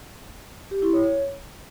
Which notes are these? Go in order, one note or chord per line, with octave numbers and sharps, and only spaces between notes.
G4
E4
C#5